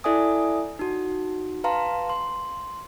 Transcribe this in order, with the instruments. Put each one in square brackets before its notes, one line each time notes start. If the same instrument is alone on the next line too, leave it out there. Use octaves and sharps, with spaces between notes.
[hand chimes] E4 A4 D5 E5 G#5 D#6
D#4 F#4
B4 F5 A5 A#5 C6
C6